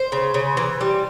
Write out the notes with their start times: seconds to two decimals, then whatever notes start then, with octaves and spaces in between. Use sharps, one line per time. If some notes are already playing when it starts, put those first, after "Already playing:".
Already playing: C5
0.12 C#3
0.34 C#3
0.57 E3
0.81 G3